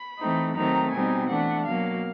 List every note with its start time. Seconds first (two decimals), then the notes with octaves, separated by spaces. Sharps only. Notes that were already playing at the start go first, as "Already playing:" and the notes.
Already playing: B5
0.19 E3 A3 C4 D#4
0.55 D#3 F#3 A3 C4 D#4 A#5
0.92 B2 G3 C4 D#4 G#5
1.29 E3 A3 D4 F#5
1.65 B2 F#3 A#3 F5